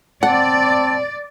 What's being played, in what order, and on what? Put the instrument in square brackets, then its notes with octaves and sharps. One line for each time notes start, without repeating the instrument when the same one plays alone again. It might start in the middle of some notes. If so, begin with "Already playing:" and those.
[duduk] C4 [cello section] D5 [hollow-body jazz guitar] F#5 [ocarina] A5